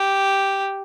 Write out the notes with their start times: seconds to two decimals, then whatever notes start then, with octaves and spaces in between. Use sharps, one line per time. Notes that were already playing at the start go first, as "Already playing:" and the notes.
Already playing: G4